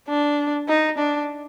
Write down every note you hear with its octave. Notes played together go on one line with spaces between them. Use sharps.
D4
D#4
D4